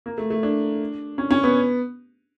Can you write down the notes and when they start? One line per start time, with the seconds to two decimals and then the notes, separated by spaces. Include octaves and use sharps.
0.06 A#3
0.18 A3
0.30 A3
0.43 D4
1.18 C#4
1.31 C#4
1.43 B3